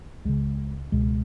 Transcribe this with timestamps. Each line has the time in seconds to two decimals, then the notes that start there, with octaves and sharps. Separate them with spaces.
0.25 C#2 C#3 G#3
0.92 C#2 B2 G#3